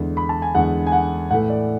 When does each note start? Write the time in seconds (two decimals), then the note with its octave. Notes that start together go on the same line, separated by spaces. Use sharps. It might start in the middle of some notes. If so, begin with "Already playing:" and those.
Already playing: E2 D3 G#3
0.17 B5
0.29 A5
0.42 G#5
0.55 E2 D3 G#3 F#5
0.86 G#5
0.92 F#5
1.31 A2 E3 A3 F#5
1.50 D5